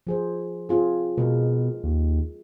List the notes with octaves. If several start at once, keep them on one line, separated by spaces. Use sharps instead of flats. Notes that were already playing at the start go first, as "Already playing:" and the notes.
F3 G#4 C5
C4 F4 G#4
B2 G#3 A#4
D#2